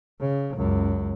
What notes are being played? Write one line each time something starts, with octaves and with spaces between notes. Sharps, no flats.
C#3
C#2 F#2